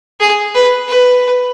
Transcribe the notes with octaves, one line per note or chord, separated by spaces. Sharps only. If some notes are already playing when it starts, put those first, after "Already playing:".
G#4
B4
B4